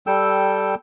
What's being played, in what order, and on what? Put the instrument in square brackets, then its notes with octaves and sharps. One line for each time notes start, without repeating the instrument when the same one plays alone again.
[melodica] G3 A4 G5 E6